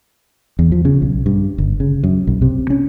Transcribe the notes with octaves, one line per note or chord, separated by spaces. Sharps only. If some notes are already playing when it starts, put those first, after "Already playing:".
E2
F3
C#3
B1
G2
G1
C#3
F#2
B1
C3
C#4